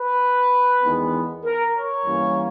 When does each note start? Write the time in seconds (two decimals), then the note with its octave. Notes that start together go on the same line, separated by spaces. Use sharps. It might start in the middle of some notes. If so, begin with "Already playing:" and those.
Already playing: B4
0.83 E2 D#3 G#3 B3
1.44 A#4
1.75 C#5
2.05 G2 E3 A#3 C#4